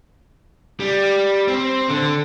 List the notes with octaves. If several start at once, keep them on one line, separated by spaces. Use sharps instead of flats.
G3
C4
D3